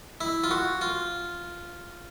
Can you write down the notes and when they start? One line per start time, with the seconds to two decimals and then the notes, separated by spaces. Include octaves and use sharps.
0.21 E4
0.44 F4
0.51 F#4
0.81 F4